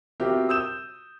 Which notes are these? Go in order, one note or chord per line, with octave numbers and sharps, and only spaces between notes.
B2 C4 F4 G4 A#4 E5
D#6 E6 G6 E7